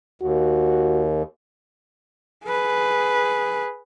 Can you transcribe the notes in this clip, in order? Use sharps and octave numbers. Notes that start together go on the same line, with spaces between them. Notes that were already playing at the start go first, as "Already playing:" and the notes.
D#2 F#4
G#4 B4